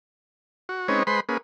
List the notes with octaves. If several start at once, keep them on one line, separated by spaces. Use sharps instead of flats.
F#4
G#3 C4 C#4 D#4 B4 C#5
G#3 B4 C5 B5 C6
A#3 C#4 G#4 B4